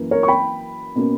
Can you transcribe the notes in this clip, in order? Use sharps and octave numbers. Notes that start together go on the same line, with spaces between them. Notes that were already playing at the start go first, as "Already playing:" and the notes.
Already playing: F#2 E3 A#3
A#4 C#5
C#6
G5 B5
B2 A#3 C#4